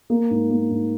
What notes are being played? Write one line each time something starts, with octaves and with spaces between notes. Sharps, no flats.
A#3
G#2
A#3
G#2